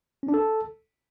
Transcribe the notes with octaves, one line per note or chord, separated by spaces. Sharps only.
C#4
D4
A4